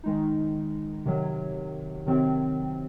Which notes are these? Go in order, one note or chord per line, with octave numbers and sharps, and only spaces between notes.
D#3 G#3 D#4
C3 D#3 F#3
C3 D#3 F#3 C4